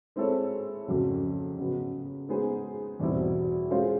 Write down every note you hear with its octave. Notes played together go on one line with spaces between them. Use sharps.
G#3 C4 E4 A4 C#5
F2 C#3 F#3
C#3 F#3 B3
G#3 B3 D#4 G#4 C5
E2 B2 G3 C4 E4
G#3 C#4 F4 G#4 C5